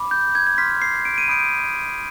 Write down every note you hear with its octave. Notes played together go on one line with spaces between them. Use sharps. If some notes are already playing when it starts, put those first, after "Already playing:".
Already playing: B5 D6
G6
G#6
G#6
C6 F6 B6
C7
D7
D#7
B5 D#6 G6 D7